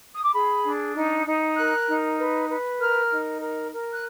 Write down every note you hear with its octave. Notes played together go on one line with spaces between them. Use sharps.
D#6
D6
G#4 B5
D4
D#4
D#4
A#4 F#6
D#4
B4
B4
A#4 F6
D#4
A#4
A#4
F#6